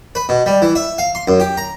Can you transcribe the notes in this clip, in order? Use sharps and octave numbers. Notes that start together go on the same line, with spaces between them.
B4
B2
G3
E3
E5
F5
C6
F#2
G4
A#5